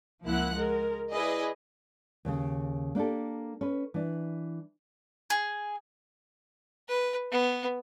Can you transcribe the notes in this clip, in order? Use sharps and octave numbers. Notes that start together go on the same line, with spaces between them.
C#2 F3 A#3 E4 F#5 F#6
G#3 A#4
E4 G#4 B4 D5 D#5
D#2 A2 C#3
A#3 D4 G4 A4
C#4 B4
E3 D4
G#4
B4
B3